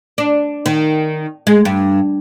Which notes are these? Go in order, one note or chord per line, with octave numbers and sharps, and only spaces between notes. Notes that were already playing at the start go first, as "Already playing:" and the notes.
D4
D#3
G#3
G2